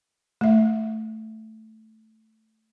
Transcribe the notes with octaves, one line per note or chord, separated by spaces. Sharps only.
A3 E5